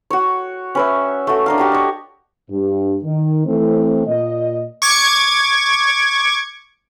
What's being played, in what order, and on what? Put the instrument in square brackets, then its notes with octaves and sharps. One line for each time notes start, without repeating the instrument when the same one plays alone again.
[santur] F#4 C#5
C#4 B4 E5
A3 F#4
D4 A#4 F5
F#4 G4 A5
C#5 D#5
[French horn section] G2
D#3
E3 A3 C4
A#2 D#5
[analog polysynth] C#6 D6 G#6